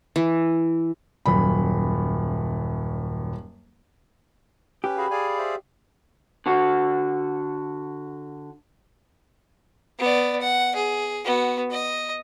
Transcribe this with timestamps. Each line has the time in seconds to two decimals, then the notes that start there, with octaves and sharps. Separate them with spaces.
0.16 E3
1.26 D#1 F#2 B5
4.84 C#4 G4 B4
4.97 F#4 G#4 F5 B5
5.11 G#4 D5 F5 G#5
5.38 C5 E5
6.46 D3 F#4
9.99 B3 D5
10.41 F#5
10.75 G#4
11.25 B3 F#4
11.71 D#5